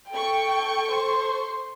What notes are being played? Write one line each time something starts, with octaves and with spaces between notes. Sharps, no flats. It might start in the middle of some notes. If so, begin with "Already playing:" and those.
A4 G5 C#6
C5